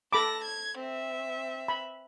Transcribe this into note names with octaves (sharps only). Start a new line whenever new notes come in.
A4 A5 B5 D6 A#6
G#6
C4 E5
B5